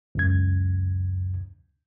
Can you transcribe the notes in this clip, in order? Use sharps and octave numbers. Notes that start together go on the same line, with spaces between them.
C#2 F#2 G#6